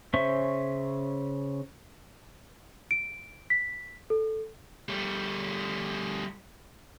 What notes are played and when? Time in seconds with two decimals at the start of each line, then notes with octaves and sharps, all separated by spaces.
0.14 C#3 C#4 C5 E5 C#6
2.91 D7
3.50 B6
4.10 A4
4.89 G3 A3